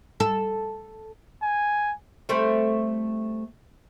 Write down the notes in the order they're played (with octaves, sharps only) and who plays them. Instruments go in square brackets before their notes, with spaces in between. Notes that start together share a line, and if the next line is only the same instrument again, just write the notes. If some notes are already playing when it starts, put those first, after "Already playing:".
[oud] A4
[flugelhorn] G#5
[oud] G3 A3 C4